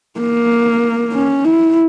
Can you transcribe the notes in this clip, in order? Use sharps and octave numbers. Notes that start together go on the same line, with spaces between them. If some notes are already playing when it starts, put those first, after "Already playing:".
A#3
C#4
E4